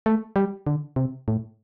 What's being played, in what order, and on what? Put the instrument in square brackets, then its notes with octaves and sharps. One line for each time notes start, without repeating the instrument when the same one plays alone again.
[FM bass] A3
G3
D3
C3
A2